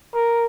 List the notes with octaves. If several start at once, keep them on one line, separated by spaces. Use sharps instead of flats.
A#4